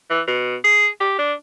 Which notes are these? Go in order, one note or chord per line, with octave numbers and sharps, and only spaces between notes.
E3
B2
G#4
G4
D4